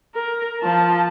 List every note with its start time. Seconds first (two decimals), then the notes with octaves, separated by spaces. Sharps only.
0.15 A#4
0.61 F3 A5